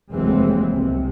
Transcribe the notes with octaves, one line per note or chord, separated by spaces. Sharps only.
F1 D#2 E3 F#3 G#3 C4
C2 C3